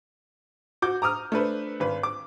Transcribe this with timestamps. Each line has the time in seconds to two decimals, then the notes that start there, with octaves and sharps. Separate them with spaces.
0.82 F#4 D6 G6
1.02 A#5 D6 D#6 F6
1.32 A3 D4 B4 C5
1.80 G#1 B4
2.03 D6